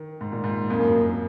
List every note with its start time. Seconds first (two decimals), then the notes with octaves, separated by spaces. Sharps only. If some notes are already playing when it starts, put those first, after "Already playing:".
Already playing: D#3
0.21 G#2
0.32 A#2
0.44 G#2
0.70 F2 A#3
0.79 F#2
0.89 F2
0.97 F#2